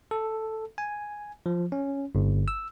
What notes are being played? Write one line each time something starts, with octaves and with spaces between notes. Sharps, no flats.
A4
G#5
F3
C#4
G1
E6